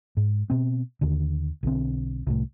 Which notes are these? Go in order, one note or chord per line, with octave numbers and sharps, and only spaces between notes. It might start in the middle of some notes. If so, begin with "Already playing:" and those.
G#2
B2 C4
D#2 D3
B1 D3 C4
C2 A2